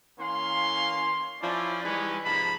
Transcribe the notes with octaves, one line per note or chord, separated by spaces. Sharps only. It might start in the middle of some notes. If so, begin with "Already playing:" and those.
E3 A#3 C#4 F5 C6
F3 C#4 E4 D5
E3 G3 G#3 C#4 D#4 B4
G#2 C3 F3 A#3 A5 B5